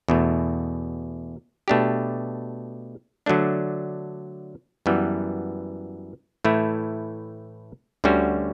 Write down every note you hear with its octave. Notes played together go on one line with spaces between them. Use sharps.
E2 B2 A3
B2 A3 D4 G4
D3 F#3 A3 D4
F#2 E3 G3 B3
A2 E3 A3 E4
D2 D3 G3 C#4 F#4